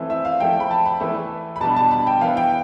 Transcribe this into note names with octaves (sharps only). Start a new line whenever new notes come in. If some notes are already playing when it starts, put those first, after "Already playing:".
Already playing: E3 A3 C4 E4
E5
F5
F3 A3 E4 G5
B5
A5
B5
E3 A3 E4
B5
B2 G3 D4 A5
A5
B5
G5
E3 B3 E4 F5
G5